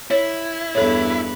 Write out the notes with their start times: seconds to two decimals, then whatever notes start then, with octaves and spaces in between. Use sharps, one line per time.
0.11 E4 C#5
0.75 E2 G2 A4 B4 C#5